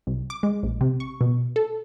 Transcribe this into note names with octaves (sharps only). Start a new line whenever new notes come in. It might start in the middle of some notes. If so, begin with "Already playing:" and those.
C2
D6
G#3
A#1
C3
C#6
B2
A4